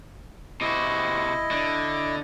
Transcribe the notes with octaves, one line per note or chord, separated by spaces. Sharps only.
C3 E4 F#4 D#5
D3